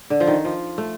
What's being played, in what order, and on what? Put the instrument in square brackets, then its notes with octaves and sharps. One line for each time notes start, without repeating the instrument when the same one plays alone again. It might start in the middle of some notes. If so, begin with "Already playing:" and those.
[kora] D3
F3
D#3
F3
A3